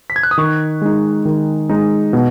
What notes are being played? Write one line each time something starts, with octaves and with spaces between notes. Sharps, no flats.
B6
G#6
F#6
D#6
D#3 C#6
G#3 D#4
D#3
G#3 D#4
B2